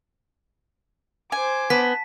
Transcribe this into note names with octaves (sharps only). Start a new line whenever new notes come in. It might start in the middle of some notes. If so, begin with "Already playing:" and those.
C5 G#5 D6
B3 A5 B6